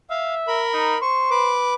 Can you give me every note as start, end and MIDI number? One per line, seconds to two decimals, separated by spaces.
0.10 0.62 76
0.10 0.34 77
0.48 0.98 70
0.48 0.98 83
0.74 0.96 63
1.01 1.54 72
1.01 1.30 85
1.31 1.74 71
1.31 1.74 86